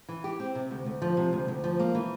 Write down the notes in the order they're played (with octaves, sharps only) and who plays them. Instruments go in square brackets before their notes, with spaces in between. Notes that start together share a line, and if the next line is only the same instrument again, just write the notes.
[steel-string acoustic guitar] E3
G4
C4
C3
D2
D2
F3
C3
D2
D2
F3
A#3
E3